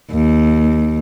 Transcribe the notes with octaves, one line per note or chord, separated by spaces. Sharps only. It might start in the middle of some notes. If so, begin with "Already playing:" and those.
D#2